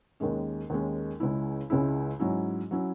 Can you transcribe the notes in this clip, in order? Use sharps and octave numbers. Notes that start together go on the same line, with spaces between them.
D#2 D#3 G#3 C#4
D#2 D#3 G#3 C#4
C#2 C#3 G#3 C#4 E4
C#2 C#3 G#3 C#4 E4
G#2 F#3 C#4 E4
F#3 C#4 E4